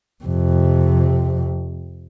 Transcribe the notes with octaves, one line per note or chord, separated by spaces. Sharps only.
F2 C3